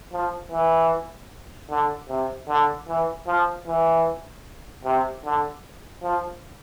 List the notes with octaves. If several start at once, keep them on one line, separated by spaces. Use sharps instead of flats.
F3
E3
D3
C3
D3
E3
F3
E3
C3
D3
F3